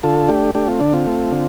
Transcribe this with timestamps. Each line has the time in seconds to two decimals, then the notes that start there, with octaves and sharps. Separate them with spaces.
0.03 D3 F4 A4
0.28 A3 D4 G4
0.55 A3 D4 G4
0.68 C4 F4
0.80 D3 D4
0.93 C4 F4
1.07 A3
1.32 D3